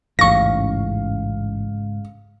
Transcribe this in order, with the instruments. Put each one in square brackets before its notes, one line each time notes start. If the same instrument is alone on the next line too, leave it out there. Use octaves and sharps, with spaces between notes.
[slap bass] A1 E2 [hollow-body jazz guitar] G#2 C#3 [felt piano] F5 [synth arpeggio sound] C#6 A#6